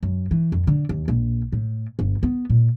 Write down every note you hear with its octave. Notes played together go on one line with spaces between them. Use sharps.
F#2
E3
F2
D3
D#2
A#1
A2
G1
B3
A#2